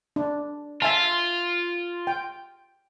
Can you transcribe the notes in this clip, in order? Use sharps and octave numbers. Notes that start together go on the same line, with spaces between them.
D4
F4 E5 G#5 A5
G5